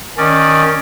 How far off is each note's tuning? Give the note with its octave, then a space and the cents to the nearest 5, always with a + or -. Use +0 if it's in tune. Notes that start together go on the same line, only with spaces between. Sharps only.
D#3 +0 C#4 +0 D5 +5